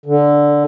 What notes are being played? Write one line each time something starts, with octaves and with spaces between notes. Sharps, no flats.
D3